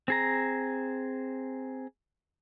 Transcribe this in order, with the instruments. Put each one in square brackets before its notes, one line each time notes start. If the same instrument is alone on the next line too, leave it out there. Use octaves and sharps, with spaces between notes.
[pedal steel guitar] C4 G#4 A#5